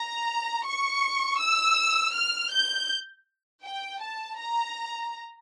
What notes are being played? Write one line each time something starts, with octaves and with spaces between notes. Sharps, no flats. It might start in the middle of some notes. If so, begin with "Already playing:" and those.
Already playing: A#5
C#6
E6
F6
G6
G5
A5
A#5